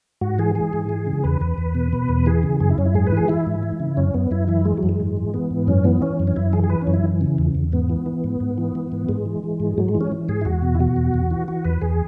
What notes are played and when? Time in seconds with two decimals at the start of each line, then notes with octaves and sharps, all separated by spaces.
0.21 G#2 F#4
0.39 E3 G#4
0.55 E3 G#4
0.73 G#2
0.89 E3
1.07 C#3
1.24 E2 B4
1.41 E2 B4
1.58 E2
1.75 B2
1.93 B2
2.09 E2
2.26 E3 G#4
2.43 C#3
2.60 F#2 G#4
2.70 E4
2.78 F#2 C#4
2.85 E4
2.95 G#2 G#4
3.07 B4
3.12 E3 G#4
3.28 E3 E4
3.46 G#2
3.63 E3
3.80 C#3
3.97 F#2 C#4
4.14 F#2 B3
4.31 F#2 E4
4.48 E3 E4
4.65 E3 G#3
4.78 F#3
4.83 F#2
4.89 G#3
5.00 G#2
5.17 E3
5.34 E3 B3
5.51 G#2
5.67 F#2 C#4
5.84 E3 B3
6.02 E3 C#4
6.19 F#2
6.27 C#4
6.36 F#2 E4
6.53 E3 G#4
6.63 G#4
6.69 E3 B4
6.82 C#4
6.87 F#2
6.93 E4
7.04 E3
7.21 C#3
7.38 E2
7.55 E2
7.72 G#2 B3
7.89 E3
8.06 E3
8.24 G#2
8.40 G#2
8.58 E3
8.75 E3
8.92 G#2
9.09 G#2 G#3
9.25 E3
9.44 E3
9.60 G#2
9.78 G#2 F#3
9.89 G#3
9.95 E3
10.01 C#4
10.12 E3
10.29 G#2 G#4
10.41 E4
10.45 E2 F#4
10.62 B2
10.75 E4
10.79 B2 F#4
10.96 E2
11.14 E2
11.31 E3
11.48 E3 F#4
11.65 E2 B4
11.81 E2 G#4